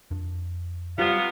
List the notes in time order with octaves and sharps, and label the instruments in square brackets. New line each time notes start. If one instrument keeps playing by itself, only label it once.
[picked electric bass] F2 D4
[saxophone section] C3 B3 [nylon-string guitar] G3 F4 [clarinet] F5